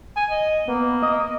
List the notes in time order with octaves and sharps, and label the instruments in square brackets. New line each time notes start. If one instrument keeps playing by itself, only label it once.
[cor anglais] G#5
D#5
[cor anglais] A#3 [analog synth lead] B3
[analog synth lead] D#5